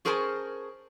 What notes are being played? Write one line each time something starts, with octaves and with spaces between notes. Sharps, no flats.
C#4 G#4 A#4 C5 G#5 A5